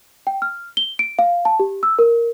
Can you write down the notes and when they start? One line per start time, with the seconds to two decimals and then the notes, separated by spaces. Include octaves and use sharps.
0.27 G5
0.42 F6
0.77 G7
0.99 D7
1.19 F5
1.45 A5
1.60 G4
1.83 E6
1.99 A#4